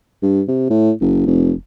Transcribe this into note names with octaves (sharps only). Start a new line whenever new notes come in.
G2
C3
A2
F#1
F1